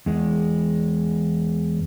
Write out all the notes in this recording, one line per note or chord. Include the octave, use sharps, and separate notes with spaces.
E2 G#3